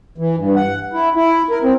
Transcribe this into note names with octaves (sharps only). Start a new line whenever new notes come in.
E3
G2
F#5
E4
E4
A#4
C4